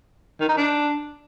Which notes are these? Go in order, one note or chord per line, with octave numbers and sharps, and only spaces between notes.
D#3
D#4
D4